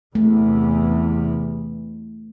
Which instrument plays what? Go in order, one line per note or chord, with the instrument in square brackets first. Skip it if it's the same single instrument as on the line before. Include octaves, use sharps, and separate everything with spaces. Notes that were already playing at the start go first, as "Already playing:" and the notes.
[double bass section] E2 C3 E3 [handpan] A3